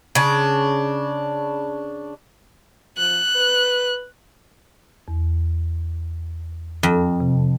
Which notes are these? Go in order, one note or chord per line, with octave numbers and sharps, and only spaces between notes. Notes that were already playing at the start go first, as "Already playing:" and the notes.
C#3 D4
F3 F#6
B4
E2
F2
C3